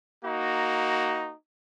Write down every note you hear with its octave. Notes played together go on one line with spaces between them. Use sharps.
A#3 D#4 F#4